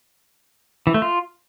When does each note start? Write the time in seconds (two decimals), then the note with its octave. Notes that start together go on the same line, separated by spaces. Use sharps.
0.87 E3
0.94 A3
1.02 F4